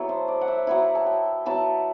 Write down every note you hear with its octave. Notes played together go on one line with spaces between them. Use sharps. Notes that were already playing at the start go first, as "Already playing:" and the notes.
Already playing: F#3 B3 E4 A4 D5 E5
C5
D5
F#5
E5
F#3 B3 E4 F#5
A5
G5
F#3 B3 E4 A5